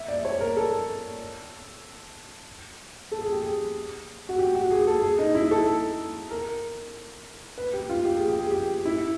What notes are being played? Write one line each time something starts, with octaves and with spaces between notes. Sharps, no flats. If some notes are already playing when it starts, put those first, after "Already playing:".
Already playing: E5
D5
C#5
A#4
A4
A4
G#4
G4
G#4
F#4
G4
F#4
G#4
A4
G#4
D#4
E4
A4
A#4
B4
G4
F4
G4
G#4
G4
G#4
G4
E4